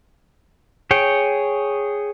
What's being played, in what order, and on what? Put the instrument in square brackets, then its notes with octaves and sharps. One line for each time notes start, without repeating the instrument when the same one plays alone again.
[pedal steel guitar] G#4 C#5 G5